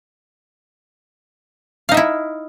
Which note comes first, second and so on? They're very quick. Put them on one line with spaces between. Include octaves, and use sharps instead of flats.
F5 D#4 E5 E4